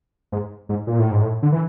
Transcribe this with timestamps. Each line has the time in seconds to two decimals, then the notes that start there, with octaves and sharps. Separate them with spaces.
0.32 G#2
0.69 G#2
0.87 A#2
0.99 A2
1.11 G#2
1.22 A2
1.43 D3
1.52 E3